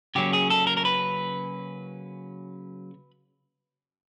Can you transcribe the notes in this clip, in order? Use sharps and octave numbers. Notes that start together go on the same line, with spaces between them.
C#3 F#3 A#3 C#4 G4
G#4
A4
A#4
A#4
B4